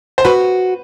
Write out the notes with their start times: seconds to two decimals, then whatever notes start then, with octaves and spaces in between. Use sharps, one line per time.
0.18 C5
0.25 F#4 B4